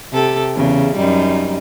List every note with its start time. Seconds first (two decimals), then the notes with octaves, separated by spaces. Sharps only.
0.12 C3 G4 A4
0.55 E2 C#3
0.96 F#2 G3 D#4